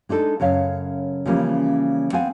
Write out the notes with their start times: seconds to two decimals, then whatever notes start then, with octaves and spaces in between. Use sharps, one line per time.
0.09 G#3 D4 D#4 A4
0.40 F#2 C#3 C#5 F5
1.26 C#3 E3 F3 G3 A#3 C#4
2.13 B3 C4 F5 G#5